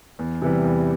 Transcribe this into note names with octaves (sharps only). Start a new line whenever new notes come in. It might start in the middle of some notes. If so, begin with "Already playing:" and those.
E2
C3 E3 G3
E2